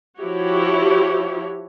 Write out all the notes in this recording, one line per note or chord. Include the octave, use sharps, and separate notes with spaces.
F3 E4 F#4 G4 C#5